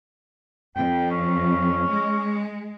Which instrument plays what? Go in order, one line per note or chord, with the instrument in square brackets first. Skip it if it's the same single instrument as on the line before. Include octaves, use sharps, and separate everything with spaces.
[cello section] F2 [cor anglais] G5
[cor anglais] C#4
[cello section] G#3